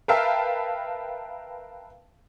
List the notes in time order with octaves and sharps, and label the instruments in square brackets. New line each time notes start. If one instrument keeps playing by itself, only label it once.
[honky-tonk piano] A#4 B4 E5 F5 G5 A5